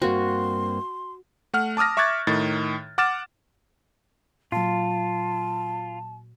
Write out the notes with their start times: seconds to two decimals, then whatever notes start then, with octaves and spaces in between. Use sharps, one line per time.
0.02 G2 A#3 C4 F#4 C6
1.54 A3 F#5 F6
1.77 A5 D6 D#6 F6 A#6
1.97 E5 C#6 D6 F#6 G#6 A6
2.27 A2 D#3 A6
2.98 F#5 D6 F6 A6 E7
4.52 A#2 F#3 F4 A5